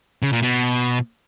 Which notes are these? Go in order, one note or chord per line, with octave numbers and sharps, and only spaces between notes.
C#3
A#2
B2